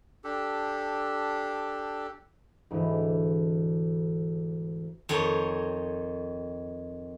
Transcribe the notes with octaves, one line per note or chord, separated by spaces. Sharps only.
D4 G4 A4
D2 G#2 E3
F2 D#3 D#4 C#5